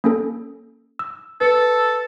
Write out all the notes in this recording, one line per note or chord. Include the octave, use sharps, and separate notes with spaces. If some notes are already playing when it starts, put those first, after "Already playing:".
A#3 C#4 A4
E6
A4 B4 C#7